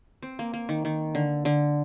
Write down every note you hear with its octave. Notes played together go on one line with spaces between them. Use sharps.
C4
A#3
A#3
D#3
D#3
D3
D3